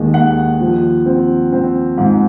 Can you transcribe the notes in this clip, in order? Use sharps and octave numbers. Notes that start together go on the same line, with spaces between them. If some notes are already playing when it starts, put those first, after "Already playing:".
Already playing: D#2 D#3 G#3
D#2 F#5
F3
C4
C4
G#2